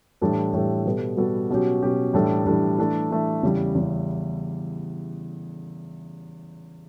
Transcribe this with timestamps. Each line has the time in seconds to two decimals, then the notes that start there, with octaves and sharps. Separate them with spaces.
0.21 A2 E3 G3 D4 A4
0.53 A2 E3 G3 D4 A4
0.86 B2 G3 B3 F#4 A4
1.17 B2 G3 B3 F#4 A4
1.50 B2 F#3 C#4 G4
1.83 B2 F#3 C#4 G4
2.14 A2 E3 G3 D4 A4
2.46 A2 E3 G3 D4 A4
2.78 E3 A3 D4 A4
3.11 E3 A3 D4 A4
3.42 E2 C#3 G3 C#4 E4
3.75 E2 C#3 G3 C#4 E4